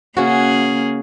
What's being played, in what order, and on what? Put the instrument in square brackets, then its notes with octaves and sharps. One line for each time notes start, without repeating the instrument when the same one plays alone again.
[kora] C#3 F#4 [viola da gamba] A#3 C#4 G#4